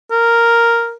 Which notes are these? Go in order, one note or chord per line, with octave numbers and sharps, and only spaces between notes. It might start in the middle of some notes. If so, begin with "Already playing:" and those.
A#4